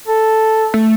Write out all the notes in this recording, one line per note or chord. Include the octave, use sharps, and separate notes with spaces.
A4
A3